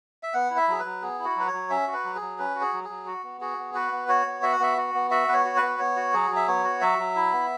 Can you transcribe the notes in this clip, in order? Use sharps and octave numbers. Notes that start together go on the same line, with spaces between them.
E5
B3 F#5
E4
E5
F#3 G#4
B4
F#3
B3 G#4
E4
F#4
F#3 B4
C#5
F#3
C#4 E5
F#4
B4
F#3
G#4
F#3
C#4 B4
F#4
G#4
F#3
G#4
F#3
F#4
B3
F#4 G#4
B3
F#4 B4
B3
F#4 C#5
B3
F#4 E5
F#5
B3 E5
F#4
B3
F#4 E5
B3 B4
C#5
F#4
B4
B3
B3 C#5
F#4
F#3 G#4
F#3
E5
B3 C#5
F#4
F#3 E5
F#3
E4
B3